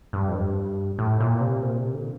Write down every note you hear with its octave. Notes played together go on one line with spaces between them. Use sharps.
G2
F2
G2
A2
A#2
C3
A#2
C3
D3